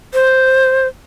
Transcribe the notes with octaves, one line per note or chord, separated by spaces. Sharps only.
C5